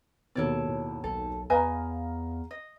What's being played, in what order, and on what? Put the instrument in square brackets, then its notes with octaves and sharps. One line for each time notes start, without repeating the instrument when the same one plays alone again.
[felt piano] D#2 B2 [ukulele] A4 C#5 D5
[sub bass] A2
[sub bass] B1 [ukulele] A4
[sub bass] E2 [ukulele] B4 D#5 G#5 [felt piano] F5 A#5
[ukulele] D#5